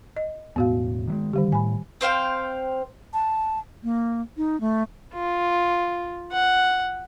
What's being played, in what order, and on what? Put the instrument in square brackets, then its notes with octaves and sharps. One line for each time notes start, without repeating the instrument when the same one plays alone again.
[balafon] D#5
[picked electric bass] E1 A2 [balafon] B3 F#4 F5
[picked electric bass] D#3 F#3 G#3
[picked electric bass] D3 [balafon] D#3 G3 G4
[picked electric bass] A2 [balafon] G#5 B5
[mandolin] C4 C5 F5 G5
[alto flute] A5
A#3
D#4
A3
[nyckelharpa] F4
F#5